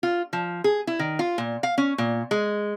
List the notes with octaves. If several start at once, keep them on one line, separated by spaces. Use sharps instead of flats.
F4
F3
G#4
E4
D#3
F4
A#2
F5
C#4
A#2
G#3